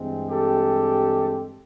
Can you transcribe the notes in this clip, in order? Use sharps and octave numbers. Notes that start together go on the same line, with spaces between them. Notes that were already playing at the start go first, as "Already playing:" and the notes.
Already playing: G2 E3 G#3 C4
G4 A4